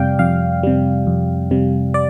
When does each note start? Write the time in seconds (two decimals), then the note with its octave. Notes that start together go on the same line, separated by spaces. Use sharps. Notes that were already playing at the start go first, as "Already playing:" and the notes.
Already playing: F2 C3 G3 D5 F5 G5
0.19 F2 F5
0.63 C3 G3
1.07 F2
1.51 C3 G3
1.94 D5